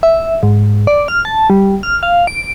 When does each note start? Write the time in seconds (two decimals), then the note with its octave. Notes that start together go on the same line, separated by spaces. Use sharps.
0.03 E5
0.43 G#2
0.87 D5
1.08 F6
1.25 A5
1.50 G3
1.83 F6
2.03 F5
2.27 D7